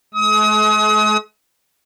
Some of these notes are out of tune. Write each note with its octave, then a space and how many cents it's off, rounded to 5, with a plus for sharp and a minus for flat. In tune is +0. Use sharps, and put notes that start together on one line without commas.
G#3 +45 D#6 +35